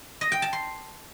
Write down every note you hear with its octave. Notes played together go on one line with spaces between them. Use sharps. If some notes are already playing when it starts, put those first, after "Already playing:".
D#5
G5
A5
C6